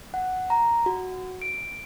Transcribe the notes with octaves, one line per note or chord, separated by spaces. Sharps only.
F#5
A#5
F#4
D7